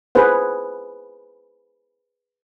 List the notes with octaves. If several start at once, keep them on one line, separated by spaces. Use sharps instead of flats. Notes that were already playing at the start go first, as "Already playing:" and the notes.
G#4 B4 C5 F#5